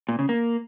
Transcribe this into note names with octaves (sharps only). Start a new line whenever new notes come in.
A#2
C#3
A#3